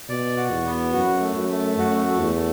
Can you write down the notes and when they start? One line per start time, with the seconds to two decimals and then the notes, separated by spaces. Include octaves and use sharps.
0.09 B2 D5
0.36 F#4
0.50 E2
0.66 B3
0.93 F#2 F#4
1.21 A3
1.36 F#2
1.49 A3
1.78 F#2 F#4
2.06 A3
2.20 E2
2.34 A3